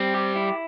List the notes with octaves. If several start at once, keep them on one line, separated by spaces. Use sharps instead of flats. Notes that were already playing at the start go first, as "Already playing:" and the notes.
Already playing: G3 C4
G4
E4